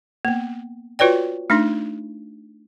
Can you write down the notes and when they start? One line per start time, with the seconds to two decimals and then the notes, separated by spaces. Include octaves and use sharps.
0.25 A#3 B3
0.99 F4 F#4 B4 C#5 D5 G5
1.50 A3 D4 D#4 C6